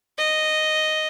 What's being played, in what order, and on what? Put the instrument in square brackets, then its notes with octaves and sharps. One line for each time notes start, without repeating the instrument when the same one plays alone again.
[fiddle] D#5